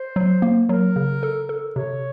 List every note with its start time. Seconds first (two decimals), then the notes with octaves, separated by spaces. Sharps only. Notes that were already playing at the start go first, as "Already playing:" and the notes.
Already playing: C5
0.16 F#3
0.42 A#3
0.69 F#3 A#4
0.96 C#3
1.23 A4
1.49 A4
1.76 C3 C#5